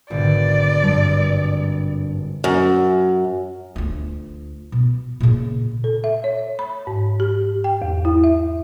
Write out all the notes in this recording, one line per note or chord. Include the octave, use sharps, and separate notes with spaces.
G#1 B2 D3 D5
G2 G3
F#2
D2 F4
B2
A#2 C#3
A4
E5
C#5
B5
G#2
G4
G5
E2
E4
E5